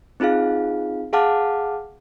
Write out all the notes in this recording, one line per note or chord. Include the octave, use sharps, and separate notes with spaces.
C4 D#4 F4 G#4 F5
G#4 F5 F#5 A5 D6 F6